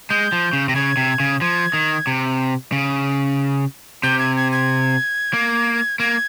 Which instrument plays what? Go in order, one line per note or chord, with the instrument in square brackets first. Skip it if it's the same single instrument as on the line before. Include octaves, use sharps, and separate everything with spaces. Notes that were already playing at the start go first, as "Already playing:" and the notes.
[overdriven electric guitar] G#3 [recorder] G6
[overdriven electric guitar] F3
C#3
[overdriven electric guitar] C3 [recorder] A#6
[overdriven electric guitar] C#3 [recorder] G#6
[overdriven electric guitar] C3
C#3
[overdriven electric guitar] F3 [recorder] G#6
[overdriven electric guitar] D#3
C3
C#3
[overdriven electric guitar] C3 [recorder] G6
[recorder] G#6
G#6
G#6
[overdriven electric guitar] A#3
[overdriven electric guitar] A#3 [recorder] G#6